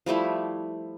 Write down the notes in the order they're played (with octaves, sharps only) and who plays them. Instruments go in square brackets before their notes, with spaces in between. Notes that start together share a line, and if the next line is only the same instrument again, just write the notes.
[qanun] F3 G3 A3 E4